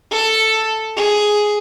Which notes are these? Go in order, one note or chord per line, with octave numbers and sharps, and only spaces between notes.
A4
G#4